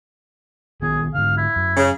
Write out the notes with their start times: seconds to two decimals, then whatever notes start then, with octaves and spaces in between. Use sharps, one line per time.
0.82 A#1 D#3 B3 G#4
1.15 G#2 D3 F5
1.37 E4
1.56 F#2
1.77 C#3